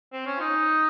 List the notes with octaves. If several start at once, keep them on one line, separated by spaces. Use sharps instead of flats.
C4
C#4
F4
D#4